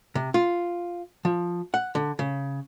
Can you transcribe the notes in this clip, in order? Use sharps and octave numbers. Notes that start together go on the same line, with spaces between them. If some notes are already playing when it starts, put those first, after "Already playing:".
C3
F4
F3
F#5
D3
C#3